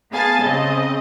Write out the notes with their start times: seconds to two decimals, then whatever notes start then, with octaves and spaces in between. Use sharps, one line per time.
0.12 B3 G#4 F5 G#5 A5 A6
0.44 C#3 C4 D#5